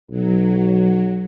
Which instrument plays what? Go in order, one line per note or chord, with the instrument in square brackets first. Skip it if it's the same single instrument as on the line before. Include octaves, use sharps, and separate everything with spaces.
[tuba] B1 [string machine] F#3